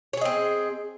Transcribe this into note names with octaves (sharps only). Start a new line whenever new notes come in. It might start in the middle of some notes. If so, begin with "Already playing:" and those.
C4 G#4 C#5 D#5